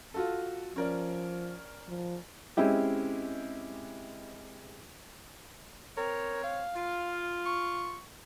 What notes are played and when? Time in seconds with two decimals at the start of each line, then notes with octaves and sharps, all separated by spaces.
0.14 F4 F#4 A4
0.76 F3 C#4 A#4 D5
1.88 F3
2.57 G#3 C4 C#4 E4 G4
5.97 C4 A#4 C#5
6.44 F5
6.76 F4
7.46 C#6